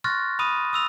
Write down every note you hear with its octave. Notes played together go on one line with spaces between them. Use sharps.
C6 C#6 F6 F#6 A6 A#6
B5 D#6 D#7
D#6 E6 F7